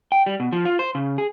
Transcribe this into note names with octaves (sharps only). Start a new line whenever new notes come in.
G5
G3
B2
F3
F4
C5
C#3
G#4